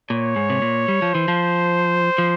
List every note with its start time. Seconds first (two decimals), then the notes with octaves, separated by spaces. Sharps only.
0.10 A#2 C#5
0.36 G#2
0.50 C3
0.62 A#2
0.88 G3
1.02 F3
1.14 E3 C5
1.28 F3
2.18 F3